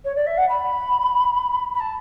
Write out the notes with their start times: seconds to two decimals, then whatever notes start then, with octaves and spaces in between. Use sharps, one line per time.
0.05 C#5
0.15 D5
0.26 E5
0.37 F#5
0.49 B5
1.74 B5
1.80 A5